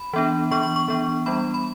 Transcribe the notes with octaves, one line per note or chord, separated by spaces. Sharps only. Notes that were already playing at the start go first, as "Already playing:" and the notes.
Already playing: B5
E3 B3 D4
E3 B3 D4 C#6
C#6
C#6
E3 B3 D4
G3 B3 D4 B5
B5